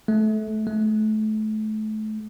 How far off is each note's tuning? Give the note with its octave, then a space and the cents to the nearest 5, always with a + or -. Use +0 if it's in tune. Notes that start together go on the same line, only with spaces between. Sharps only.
A3 -25
A3 -30